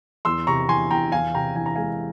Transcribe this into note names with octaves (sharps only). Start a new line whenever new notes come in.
E2 C6 E6
C3 A#5 C#6
E3 G#5 C6
E2 G5 A#5
E2 F5 G#5
C3 G5 A#5
E3 G#5
A#5
G#3 F5 G#5